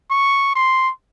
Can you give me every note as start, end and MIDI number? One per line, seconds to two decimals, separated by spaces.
0.11 0.55 85
0.55 0.90 84